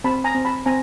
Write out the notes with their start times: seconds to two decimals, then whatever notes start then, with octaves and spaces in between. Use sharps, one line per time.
0.04 C4 A5 B5
0.24 G#5 A#5
0.35 C4
0.45 A5 B5
0.66 C4 G#5 A#5